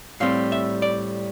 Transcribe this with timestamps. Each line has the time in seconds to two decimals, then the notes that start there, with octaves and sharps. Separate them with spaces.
0.20 A2 G3 C4 F5
0.52 E5
0.82 D5